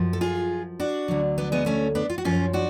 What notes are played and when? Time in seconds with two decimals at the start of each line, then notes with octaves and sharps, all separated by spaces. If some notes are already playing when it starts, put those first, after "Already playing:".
Already playing: F#2 F3
0.13 A4
0.21 F4 G#4
0.80 D4 F#4
1.08 D2 D3 F#3
1.38 B3 D4
1.52 G#3 B3
1.66 A3 C#4
1.95 B3 D4
2.10 F4
2.18 F#4
2.24 F#2 F3 C#4 F4
2.53 D4 F#4